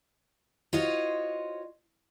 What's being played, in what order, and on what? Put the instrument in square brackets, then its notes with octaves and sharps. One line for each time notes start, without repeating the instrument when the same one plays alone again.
[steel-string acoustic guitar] F4 F#4 C5 C#5 D#5